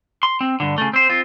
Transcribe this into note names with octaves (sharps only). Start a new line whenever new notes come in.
C6
C4
G2 D3
C#3 A3
C4 C5
C4 F4